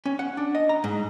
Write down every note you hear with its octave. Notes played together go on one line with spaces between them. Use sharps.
C#4
F#5
D4
D#5
A#5
G#2